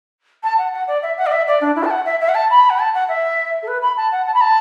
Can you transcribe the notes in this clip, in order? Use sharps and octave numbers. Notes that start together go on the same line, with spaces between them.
A5
F#5
F#5
D5
E5
F#5
D5
E5
D5
D4
E4
A5
F#5
E5
E5
F#5
A5
B5
F#5
A5
F#5
E5
A4
B4
B5
A5
F#5
A5
B5
A5